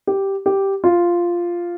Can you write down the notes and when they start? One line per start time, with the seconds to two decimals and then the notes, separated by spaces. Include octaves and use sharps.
0.07 G4
0.46 G4
0.84 F4